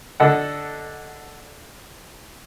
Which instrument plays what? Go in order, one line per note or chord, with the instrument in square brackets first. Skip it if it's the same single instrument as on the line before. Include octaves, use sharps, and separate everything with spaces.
[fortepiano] D3 A4 D#5 F#5